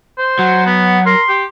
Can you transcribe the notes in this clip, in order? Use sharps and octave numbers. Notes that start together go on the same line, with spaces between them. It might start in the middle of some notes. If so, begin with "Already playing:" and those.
C5
F#3 F#5
B3
A#4 C6
G4